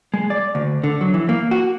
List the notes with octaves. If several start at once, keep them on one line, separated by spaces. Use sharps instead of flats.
G#3
D5
D2
D3
F#3
E3
A#3
F#4